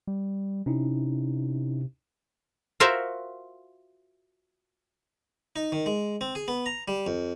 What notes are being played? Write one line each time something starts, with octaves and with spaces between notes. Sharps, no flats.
G3
C3 C#4 D#4 E4
F4 F#4 A#4 C5 E5 F5
D#4
D#3
G#3
C4
G#4
B3
A#5
G3
F2